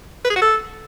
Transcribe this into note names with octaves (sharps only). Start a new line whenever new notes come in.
B4
G#4
F#4
A4